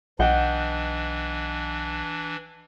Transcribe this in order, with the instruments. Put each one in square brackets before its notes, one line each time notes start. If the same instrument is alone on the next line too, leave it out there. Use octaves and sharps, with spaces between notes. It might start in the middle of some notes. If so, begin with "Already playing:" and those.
[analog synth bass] B1 [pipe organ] E3 D4 [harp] D#5 F#5 G5